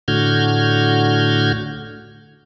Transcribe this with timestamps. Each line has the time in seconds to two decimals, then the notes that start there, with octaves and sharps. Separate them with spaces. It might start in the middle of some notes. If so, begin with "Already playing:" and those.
0.08 A2 D3 F#4 F6 G6 G#6